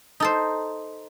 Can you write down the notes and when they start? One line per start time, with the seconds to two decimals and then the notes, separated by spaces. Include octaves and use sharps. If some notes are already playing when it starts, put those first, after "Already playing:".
0.20 D#4 A4 C5